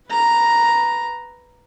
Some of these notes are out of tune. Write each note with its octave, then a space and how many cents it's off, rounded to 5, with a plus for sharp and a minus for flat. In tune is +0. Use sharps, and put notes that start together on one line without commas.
B4 +0 A#5 +0